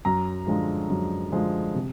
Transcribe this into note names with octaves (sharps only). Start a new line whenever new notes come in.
F#2 A#5
D3 F3 G#3
F#2
D3 F3 G#3
C3